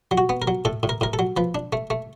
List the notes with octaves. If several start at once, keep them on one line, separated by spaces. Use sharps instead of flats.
F#3
F#4
B3
A#4
F#3
A2 A4
A2
A#4
A2 A#4
A4
F#3
F3 B4
D4
A3
A3